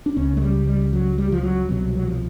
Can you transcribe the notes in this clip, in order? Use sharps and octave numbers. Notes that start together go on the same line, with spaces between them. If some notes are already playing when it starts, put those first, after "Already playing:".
D4
C#2 C#3 C#4
G#3
G3
G3
F#3
G3
F3
F#3
C2 B2 F#3
F#3
F3